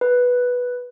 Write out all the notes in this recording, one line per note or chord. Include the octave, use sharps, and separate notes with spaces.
B4